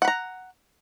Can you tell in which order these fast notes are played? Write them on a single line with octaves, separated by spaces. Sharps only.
F#5 B5 A#5